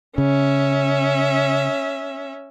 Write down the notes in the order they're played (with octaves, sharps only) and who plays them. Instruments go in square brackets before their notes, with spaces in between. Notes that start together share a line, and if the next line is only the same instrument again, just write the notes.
[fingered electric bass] C#3 [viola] C#4 E5